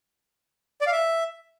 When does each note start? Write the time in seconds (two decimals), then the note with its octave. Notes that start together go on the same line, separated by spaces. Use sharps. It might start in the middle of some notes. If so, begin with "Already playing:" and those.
0.81 D5
0.87 F5
0.92 E5